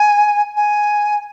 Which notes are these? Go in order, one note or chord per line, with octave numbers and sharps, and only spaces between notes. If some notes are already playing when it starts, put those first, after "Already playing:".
Already playing: G#5
G#5